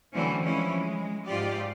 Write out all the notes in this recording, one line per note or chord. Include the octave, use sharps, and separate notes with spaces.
D3 E3 F#3 A3 C4 C#4
E3 F3 G#3 C#4 E4
G#3
G#2 F4 G4 D5